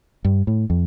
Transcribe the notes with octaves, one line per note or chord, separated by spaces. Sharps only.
G2
A2
F2